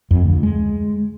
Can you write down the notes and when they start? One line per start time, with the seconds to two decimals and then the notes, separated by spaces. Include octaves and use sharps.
0.11 F2
0.24 D2
0.43 G#3